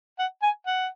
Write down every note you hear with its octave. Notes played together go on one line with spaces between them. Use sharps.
F#5
G#5
F#5